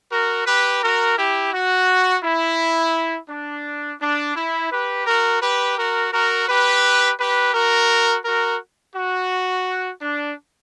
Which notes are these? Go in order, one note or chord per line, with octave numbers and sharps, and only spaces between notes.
F#4 A#4
G4 B4
F#4 A#4
E4 G4
F#4
E4
D4
D4
E4
G4 B4
F#4 A#4
G4 B4
F#4 A#4
F#4 A#4
G4 B4
G4 B4
F#4 A#4
F#4 A#4
F#4
D4